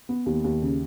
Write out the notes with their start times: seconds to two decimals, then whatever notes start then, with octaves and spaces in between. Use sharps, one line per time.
0.09 B3
0.26 D#2
0.44 D#2
0.62 C#3